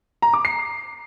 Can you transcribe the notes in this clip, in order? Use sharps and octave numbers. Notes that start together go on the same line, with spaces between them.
A#5
D6
C7